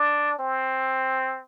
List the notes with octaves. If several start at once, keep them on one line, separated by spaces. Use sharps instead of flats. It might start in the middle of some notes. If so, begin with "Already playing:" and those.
Already playing: D4
C4